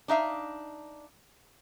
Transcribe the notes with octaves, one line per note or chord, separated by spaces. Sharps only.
D4 D#4 E5 F5